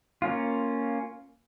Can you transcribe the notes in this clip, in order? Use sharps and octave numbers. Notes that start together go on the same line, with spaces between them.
A#3 C#4 F4